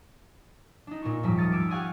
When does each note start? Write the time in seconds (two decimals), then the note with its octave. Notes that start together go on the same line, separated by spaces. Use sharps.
0.87 D4 D#4
1.02 A#2 D#4 C#6
1.23 D#1 G#1 G#2 F3 G3 B6
1.37 D#6 F6 A6 C#7
1.52 D6 E6 G#6
1.69 G4 F5 F#5 G#5 C#6 D#6